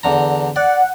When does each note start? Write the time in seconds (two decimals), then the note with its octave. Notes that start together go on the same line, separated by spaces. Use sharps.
0.03 E2 D3 A#5
0.56 D5 F#5